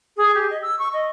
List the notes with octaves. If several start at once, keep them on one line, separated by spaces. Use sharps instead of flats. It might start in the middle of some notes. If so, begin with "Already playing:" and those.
G#4
G4
D#5
E6
C#6
D#5